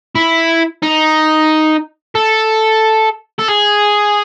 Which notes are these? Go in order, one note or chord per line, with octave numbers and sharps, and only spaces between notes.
E4
D#4
A4
A4
G#4